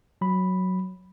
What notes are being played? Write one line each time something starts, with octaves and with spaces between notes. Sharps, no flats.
F#3 B5